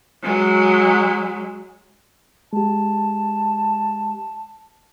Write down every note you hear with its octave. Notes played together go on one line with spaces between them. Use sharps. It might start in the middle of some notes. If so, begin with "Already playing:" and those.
F#3 G#3
G#3 G4 A5